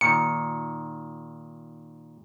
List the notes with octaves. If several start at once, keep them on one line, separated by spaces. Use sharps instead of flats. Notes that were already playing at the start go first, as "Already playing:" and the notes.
A#2 D#3 C#7